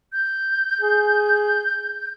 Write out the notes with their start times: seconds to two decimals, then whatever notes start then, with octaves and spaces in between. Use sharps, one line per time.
0.13 G6
0.81 G#4